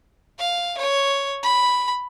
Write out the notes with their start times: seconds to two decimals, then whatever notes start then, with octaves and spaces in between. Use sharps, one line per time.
0.39 F5
0.78 C#5
1.43 B5